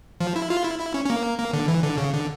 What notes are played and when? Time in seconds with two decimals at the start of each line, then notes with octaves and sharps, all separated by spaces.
0.21 F3
0.36 E4
0.50 F4
0.64 E4
0.80 E4
0.94 C#4
1.05 C#4
1.10 A#3
1.38 A#3
1.53 D3
1.68 E3
1.83 D3
1.98 C#3
2.14 D3